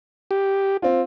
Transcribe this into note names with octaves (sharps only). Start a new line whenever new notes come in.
G4
C4 F4